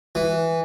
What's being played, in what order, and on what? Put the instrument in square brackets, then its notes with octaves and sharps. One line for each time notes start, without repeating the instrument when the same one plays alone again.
[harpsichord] E3